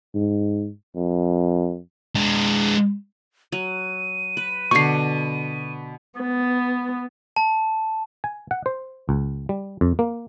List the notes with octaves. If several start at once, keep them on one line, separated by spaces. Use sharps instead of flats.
G#2
F2
G#3 D4
F#3 D#7
B4
B2 D3 C#6 C7
B3
A5
G#5
F#5
C5
C#2
G3
F2
A#3